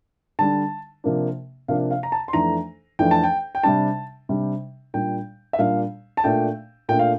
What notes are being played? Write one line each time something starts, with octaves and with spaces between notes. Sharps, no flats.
D3 G3 D4 A5
C3 F3 A#3 D4
C3 F3 A#3 D4 F5
F5
A#5
A5
C6
F2 E3 A3 D4 A#5
F2 E3 A3 D4 G5
A5
G5
G5
C3 G3 D4 A5
C3 G3 D4
A#2 G3 D4 G5
E5
A#2 G3 D4 F5
A5
A#2 A3 D4 G5
A#2 A3 D4 G5
F5